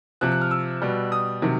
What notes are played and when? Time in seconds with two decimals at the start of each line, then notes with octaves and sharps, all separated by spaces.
0.21 C3 F3 F#6
0.32 F#6
0.41 F6
0.51 E6
0.82 B2 G3
1.12 D#6
1.42 C3 D#3 F#3